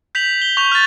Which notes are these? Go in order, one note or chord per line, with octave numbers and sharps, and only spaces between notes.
G6 B6 F7 F#7
G7
C#6 G6 F7
F6 A6